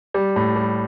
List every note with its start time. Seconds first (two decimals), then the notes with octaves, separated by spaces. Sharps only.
0.14 G3
0.36 A2
0.56 G3